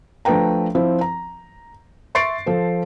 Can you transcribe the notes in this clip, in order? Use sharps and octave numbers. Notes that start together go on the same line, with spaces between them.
F3 A3 D4 B4 G5 A#5
F3 C4 E4
A#5
E5 C6 C#6 A6 C7 D7
F3 A4 C5